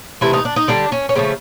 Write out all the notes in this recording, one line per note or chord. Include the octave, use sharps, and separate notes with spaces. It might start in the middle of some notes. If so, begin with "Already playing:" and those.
C3 E3 A3 E4
D#4
D4
D#4
D3 G3 D4
C#4
C#4
C#3 F3 A3 C4